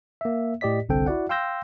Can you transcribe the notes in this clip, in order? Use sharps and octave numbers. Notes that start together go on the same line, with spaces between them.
A#3 E5
A2 G4 D5 D#5 B6
G1 C2 D3 C4 A4 G5
E4 F#4 D5 F#5
F5 G5 C6 E6 G6 A#6